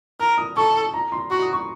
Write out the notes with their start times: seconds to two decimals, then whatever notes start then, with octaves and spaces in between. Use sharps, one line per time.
0.20 A#4 F6
0.38 D#6
0.57 A4 C#6
0.94 A#5
1.12 C6
1.31 F#4 C#6
1.42 D#6
1.53 C#6